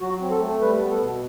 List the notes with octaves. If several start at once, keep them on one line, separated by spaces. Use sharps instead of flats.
F#3 F#4
C4
A4
A3
G3 B4
B3
A4
B2